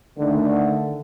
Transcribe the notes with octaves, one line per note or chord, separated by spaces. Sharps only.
D3 D#3 A3